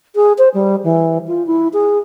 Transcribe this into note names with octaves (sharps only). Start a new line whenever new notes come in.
G#4
C5
G3
E3
F4
E4
G#4